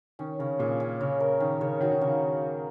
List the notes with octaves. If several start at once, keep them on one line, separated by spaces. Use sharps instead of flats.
D#3 C#4
C#3 C#4
A#2 G#4
C#4
C#3 C#5
A#4
D#3 C#4
C#3 C#5
D#3 F#4
D#3
C#3 A#3